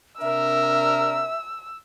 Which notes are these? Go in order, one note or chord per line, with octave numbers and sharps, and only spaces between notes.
C3 D4 A#4 E5 E6